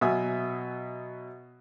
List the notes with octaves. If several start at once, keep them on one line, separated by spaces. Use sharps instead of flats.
B2 F#3 E5 G#5 D#6